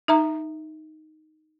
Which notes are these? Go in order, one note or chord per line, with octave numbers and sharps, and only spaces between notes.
D#4 E5 A#5